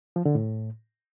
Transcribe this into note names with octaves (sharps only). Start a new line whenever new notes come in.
F3
D3
A2